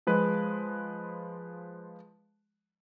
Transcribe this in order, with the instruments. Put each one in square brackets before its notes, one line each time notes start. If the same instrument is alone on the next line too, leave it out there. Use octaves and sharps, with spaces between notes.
[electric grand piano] F3 G#3 B4